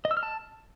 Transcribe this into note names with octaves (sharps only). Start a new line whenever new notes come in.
D#5
E6
F6
A5